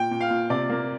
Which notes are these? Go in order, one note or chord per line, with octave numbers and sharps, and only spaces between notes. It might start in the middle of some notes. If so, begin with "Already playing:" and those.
Already playing: A#2 G5
A#2
F5
A#2
C3 D5
A#3